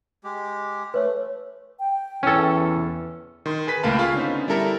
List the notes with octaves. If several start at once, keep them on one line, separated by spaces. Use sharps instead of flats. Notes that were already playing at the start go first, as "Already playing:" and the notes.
G#3 G4
A3 B4 C#5
G5
E2 E3 C#4 A4
D#3 C6
G#4 B4 B6
C#2 A3 A#3 F5 A5 B5
F4 G#4 F5 B5 C#6
D3 B3 C#4 D#4 C5
G3 E4 A4 A#4 E5